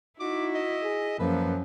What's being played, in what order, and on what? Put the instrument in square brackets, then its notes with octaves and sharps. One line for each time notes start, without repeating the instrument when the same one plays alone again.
[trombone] D#4 [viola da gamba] E4 [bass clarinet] F#4 [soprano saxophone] D6
[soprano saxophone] D#5
[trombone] G#4
[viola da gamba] F#2 [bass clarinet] F3 [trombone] A#3 [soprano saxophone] B4